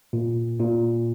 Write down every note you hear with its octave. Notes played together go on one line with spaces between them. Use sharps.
A#2
A#2